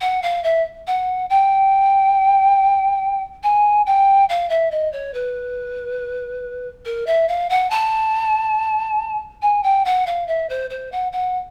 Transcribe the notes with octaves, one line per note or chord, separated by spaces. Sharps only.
F#5
F5
E5
F#5
G5
G#5
G5
F5
E5
D#5
C#5
B4
A#4
E5
F5
F#5
A5
G#5
G5
F#5
F5
E5
C5
C5
F#5
F#5